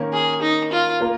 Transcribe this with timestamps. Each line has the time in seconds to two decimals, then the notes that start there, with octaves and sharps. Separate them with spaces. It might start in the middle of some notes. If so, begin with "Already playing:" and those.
Already playing: D#3 A#3 C#4 A#4
0.13 G#4
0.42 D#4
0.72 F4
1.01 A#3 F4 A#4